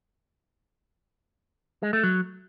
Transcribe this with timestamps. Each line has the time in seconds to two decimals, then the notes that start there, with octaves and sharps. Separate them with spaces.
1.83 G#3
1.93 A3
2.03 F#3